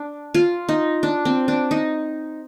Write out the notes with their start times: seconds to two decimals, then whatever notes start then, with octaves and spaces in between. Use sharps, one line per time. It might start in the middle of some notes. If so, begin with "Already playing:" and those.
Already playing: D4
0.35 F4
0.69 D#4
1.03 D4
1.25 C4
1.48 D4
1.71 D#4